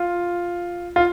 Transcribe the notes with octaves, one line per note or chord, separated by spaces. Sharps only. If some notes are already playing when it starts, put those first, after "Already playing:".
Already playing: F4
F4